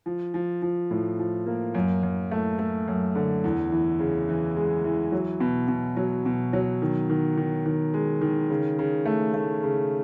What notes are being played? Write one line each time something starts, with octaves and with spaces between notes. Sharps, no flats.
F3
F3
F3
A2
F3
A#3
F#2
F#2
A3
A3
F#2
D3
E2
E3
C#3
E3
G#3
E3
F#3
B2
B2
F#3
B2
F#3
D#3
D#3
D#3
D#3
G#3
D#3
C#3
C#3
A3
A3
C#3